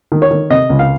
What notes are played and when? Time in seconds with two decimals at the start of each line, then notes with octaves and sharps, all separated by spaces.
0.12 D#3
0.22 C#5
0.31 D#3
0.50 C3 D#5
0.70 C#2
0.79 F5